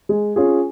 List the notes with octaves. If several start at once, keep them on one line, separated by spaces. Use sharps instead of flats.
G#3
C#4 F4 G#4